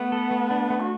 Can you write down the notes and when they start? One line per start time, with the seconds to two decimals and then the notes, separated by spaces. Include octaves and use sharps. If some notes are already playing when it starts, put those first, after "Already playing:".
Already playing: A3 B3
0.12 A4
0.31 A3
0.51 D4
0.70 A3
0.80 F#4